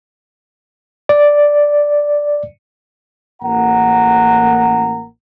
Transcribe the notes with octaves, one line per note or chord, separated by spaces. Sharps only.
D5
A1 A#3 F#5 A#5